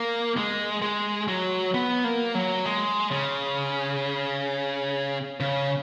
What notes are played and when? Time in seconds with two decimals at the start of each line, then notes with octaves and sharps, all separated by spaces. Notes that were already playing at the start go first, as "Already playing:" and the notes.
Already playing: A#3
0.37 G#3
0.82 G#3
1.28 F#3
1.74 B3
2.04 A#3
2.35 F#3
2.65 G#3
3.11 C#3
5.40 C#3